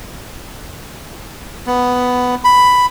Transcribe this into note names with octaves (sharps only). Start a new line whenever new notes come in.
B3
B5